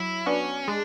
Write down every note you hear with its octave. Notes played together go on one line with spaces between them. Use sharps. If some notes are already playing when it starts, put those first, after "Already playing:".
Already playing: F#3 E4
B3 C#4 D4 F#4
G#3 D4